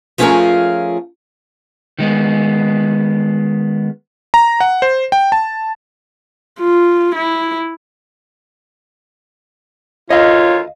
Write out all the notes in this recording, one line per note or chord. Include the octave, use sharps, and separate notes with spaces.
F3 A3 C#4 F4 G#4 A#4
D#3 G#3 B3
A#5
F#5
C5
G5
A5
F4
E4
D2 D#3 F4 C#5 D#5 F5